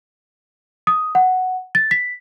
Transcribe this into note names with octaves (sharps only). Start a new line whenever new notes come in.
D#6
F#5
A6
B6